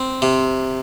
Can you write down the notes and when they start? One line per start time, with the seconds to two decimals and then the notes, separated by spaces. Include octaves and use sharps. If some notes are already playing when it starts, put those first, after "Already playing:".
Already playing: C4
0.22 C3